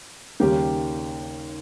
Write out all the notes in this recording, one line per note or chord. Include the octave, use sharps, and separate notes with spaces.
D#2 C#3 G3 A#3 G4 G5